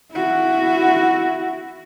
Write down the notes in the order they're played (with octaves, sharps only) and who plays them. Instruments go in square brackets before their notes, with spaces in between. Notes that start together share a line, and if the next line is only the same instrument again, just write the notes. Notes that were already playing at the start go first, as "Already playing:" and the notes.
[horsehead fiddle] E4 F#4